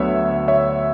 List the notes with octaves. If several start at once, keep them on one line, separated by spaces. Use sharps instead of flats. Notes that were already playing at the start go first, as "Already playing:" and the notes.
Already playing: D2 D3 F#3 B3 C#5 E5
C#5 E5